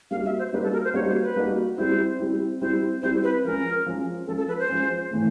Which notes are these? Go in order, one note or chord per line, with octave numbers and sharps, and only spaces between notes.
G3 A#3 D#4 F#4 F5
E5
C5
G3 A#3 D#4 F#4 B4
A4
A#4
C5
G3 A#3 D#4 F#4 C#5
C5
B4
G3 A#3 D#4 F#4
G3 C4 E4 C5
G3 C4 E4
G3 C4 E4 C5
G3 C4 E4 C5
B4
F3 G#3 C#4 A#4
F3 G#3 C#4
F3 G#3 C#4 A4
A4
B4
C5
F3 G#3 C#4
A2 E3 A3